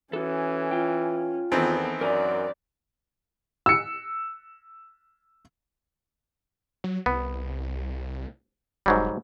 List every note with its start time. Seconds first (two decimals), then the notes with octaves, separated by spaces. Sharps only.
0.13 E3 C#4 F#4 A4
0.71 F4 G5
1.52 E2 D#3 E3 B3 C4 A4
2.01 F#2 A#4 D5 G#5 A#5
3.66 E6 C#7
6.84 F#3
7.06 C2 B3
8.86 F1 G#2 F#3 G3